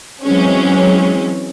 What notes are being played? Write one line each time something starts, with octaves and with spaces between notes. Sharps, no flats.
E3 F#3 G#3 C4 C#4